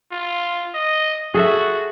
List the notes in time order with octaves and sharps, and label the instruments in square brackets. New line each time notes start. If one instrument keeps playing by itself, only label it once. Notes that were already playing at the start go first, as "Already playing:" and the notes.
[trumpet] F4
D#5
[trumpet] F#4 [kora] G#4 A4 E5